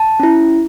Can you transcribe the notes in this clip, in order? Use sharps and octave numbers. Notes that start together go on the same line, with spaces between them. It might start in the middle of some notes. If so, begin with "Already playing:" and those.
Already playing: A5
C#4 E4